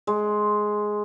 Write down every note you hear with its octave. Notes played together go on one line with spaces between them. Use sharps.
G#3